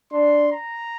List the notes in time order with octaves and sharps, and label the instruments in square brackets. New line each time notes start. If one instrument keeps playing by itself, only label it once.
[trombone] D4 [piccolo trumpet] C6
[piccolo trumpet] A#5